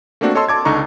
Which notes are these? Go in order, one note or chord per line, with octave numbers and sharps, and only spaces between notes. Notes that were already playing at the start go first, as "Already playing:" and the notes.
A3 A#3 C4 D4 F#4
A4 C#5 D#5 A5 C6 E6
A5 D6 G#6
C#2 D3 D#4 A#5 C#6